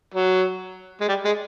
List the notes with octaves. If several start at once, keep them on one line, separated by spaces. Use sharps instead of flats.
F#3
G#3
G3
G#3